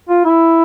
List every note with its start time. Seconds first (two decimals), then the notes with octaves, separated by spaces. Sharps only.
0.09 F4
0.25 E4